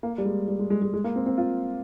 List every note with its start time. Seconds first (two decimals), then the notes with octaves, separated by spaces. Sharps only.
0.03 A#3
0.18 G3
0.25 G#3
0.48 G3
0.59 G#3
0.70 G#3
0.82 G#3
0.94 G#3
1.04 A#3
1.16 C4
1.26 C4
1.37 F4